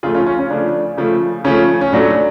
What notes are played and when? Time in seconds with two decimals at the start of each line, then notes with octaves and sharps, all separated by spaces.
0.03 C#3 F3 A3 F4 G#4
0.14 C#4 F4
0.26 C#4 F4
0.39 C#4
0.50 C#3 F3 A3 D4
0.98 C#3 F3 A3
1.44 C#3 F3 A3 C#4
1.81 C#4
1.93 A2 F#3 A3 D4